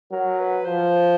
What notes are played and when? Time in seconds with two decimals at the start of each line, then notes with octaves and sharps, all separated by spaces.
0.11 F#3 A#4
0.39 B4
0.65 F3 C5